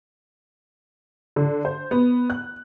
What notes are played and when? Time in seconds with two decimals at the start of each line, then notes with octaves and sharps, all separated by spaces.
1.36 D3
1.65 C5
1.91 B3
2.30 F#6